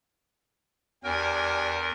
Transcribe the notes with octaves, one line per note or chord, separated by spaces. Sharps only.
E2 D4 G4 A#4 G#5